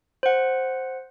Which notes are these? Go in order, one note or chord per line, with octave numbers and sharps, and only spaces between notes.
C5 F#5